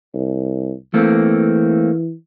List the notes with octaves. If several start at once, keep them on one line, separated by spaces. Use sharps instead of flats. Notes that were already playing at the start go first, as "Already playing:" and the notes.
C2
E3 A3 A#3 C4